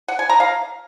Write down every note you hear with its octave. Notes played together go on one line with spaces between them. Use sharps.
F#5
G#5
A#5
F5